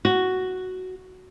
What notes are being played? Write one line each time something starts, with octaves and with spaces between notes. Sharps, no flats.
F#4